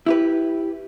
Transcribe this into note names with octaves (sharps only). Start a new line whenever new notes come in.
E4 G4 B4